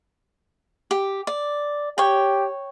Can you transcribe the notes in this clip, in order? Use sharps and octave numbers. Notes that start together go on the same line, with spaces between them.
G4
D5
G4 C#5 G5